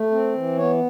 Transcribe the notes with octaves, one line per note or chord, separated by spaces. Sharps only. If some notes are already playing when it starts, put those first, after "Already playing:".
Already playing: A3
C4
E3
B3 C#5